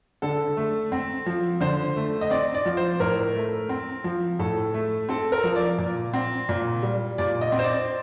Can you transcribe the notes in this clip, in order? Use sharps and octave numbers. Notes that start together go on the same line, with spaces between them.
D3 A4
A3
C4
F3
D3 C5
A3
D#5
C4 D5
D5
F3
C5
A2 A#4
A3
C4
F3
A2 A4
A3
C4 A4
A#4
F3
D5
A#2
C4
A#2
G3
A#2 D5
D#5
C4
C5
D5